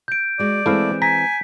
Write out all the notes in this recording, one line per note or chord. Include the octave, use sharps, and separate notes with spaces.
G6 D7
G#3 F#4 D5
E3 G#3 A3 C4 E4 F5
G#5 A#5 B6